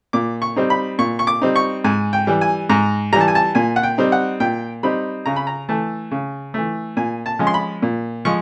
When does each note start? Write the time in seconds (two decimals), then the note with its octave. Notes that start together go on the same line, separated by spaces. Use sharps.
0.13 A#2 D6
0.42 C#6
0.56 G3 C4 D#4
0.70 B5
0.99 A#2 C#6
1.19 C#6
1.27 D6
1.42 G3 C4 D#4
1.56 C#6
1.84 G#2 G#5
2.13 G5
2.27 E3 G3
2.41 G#5
2.69 G#2 A#5
3.12 G3 A#5
3.16 E3 A5
3.28 G#5
3.35 A5
3.55 A#2 G#5
3.76 F#5
3.83 G5
3.98 G3 C4 D#4
4.12 F#5
4.40 A#2 G5
4.83 G3 C4 D#4 B5
5.26 C#3 A#5
5.36 B5
5.47 A#5
5.69 E3 A3 A5
6.11 C#3
6.54 E3 A3
6.97 A#2 G#5
7.26 A5
7.39 F3 G#3 C#4
7.47 C6
7.54 B5
7.82 A#2
8.25 F3 G#3 C#6